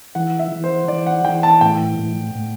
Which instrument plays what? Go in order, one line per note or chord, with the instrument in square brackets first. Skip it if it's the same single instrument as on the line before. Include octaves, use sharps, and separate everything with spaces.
[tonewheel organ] E3 [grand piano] F#5
[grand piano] E5
[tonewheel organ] E3
[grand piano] C5
[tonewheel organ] E3 [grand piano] D5
[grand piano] F#5
[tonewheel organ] E3 [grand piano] G5
[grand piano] A5
[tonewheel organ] A2 [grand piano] G5
[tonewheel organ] A2
A2